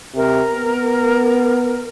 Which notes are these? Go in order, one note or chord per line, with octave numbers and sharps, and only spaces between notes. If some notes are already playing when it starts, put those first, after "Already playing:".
C3 A#4
B3